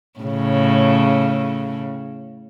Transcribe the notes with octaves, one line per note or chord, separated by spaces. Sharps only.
A2 C#3